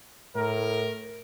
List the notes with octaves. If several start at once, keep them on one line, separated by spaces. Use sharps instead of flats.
A2 A#4